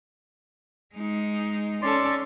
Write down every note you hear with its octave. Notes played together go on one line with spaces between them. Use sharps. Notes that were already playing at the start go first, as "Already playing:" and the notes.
G#3 D#4
C#4 A4 D5 C6